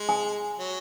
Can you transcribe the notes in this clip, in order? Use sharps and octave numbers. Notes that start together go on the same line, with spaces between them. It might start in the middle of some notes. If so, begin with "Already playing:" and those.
Already playing: G#3
G#5
F#3